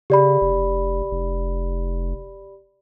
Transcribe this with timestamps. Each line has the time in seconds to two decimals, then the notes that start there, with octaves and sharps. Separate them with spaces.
0.10 C#3 G4 D5 B5
0.41 F1
1.11 F1